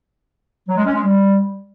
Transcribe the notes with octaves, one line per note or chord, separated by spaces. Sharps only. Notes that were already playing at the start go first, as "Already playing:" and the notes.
F#3
G#3
C#4
G#3
G3